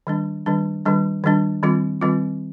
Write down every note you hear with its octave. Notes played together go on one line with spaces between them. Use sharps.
D#3 G3 D4
D#3 G3 D4
D#3 G3 D4
D#3 G3 D4
D#3 G3 C4 F4
D#3 G3 C4 F4